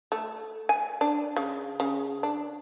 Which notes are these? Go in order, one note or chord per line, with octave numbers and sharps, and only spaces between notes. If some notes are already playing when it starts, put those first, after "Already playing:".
A3
G#5
D4
C#3
C#3
D4